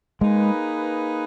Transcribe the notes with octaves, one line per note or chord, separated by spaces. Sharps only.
G#3 A#3 D#4 G#4 B4